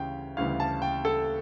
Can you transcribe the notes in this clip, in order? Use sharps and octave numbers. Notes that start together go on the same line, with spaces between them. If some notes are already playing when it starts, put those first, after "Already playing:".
Already playing: D2 C#3 E3 G3 F5 G5
D2 C#3 E3 G3 F5
A5
G5
A4